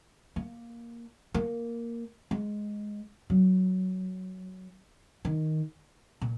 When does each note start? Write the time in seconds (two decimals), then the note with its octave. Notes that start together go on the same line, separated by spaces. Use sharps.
0.36 A#3
1.34 A#3
2.31 G#3
3.30 F#3
5.25 D#3
6.21 A#2